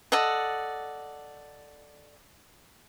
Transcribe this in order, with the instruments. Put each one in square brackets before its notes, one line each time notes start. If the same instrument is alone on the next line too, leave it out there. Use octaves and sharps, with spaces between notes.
[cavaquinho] A4 D5 D#5 F#5